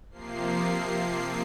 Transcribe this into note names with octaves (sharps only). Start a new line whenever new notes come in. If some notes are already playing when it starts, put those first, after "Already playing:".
C3 F3 A#3 C7